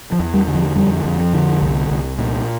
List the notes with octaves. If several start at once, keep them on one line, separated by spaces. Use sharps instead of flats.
F3
E2
G3
D3
F3
F2 G3
F2
F3
D3
C2
C2
A#2